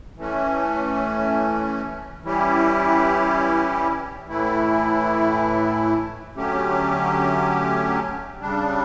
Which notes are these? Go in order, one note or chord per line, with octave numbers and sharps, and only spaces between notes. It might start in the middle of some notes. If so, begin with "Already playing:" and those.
E3 A3 C#4
E3 G3 C#4 E4 G4
A2 E3 A3 E4
D3 F#3 A3 C#4 G4
C#3 G3 D4